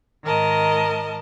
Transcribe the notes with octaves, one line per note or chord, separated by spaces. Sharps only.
G#2 D#3 A#4 D#5 A5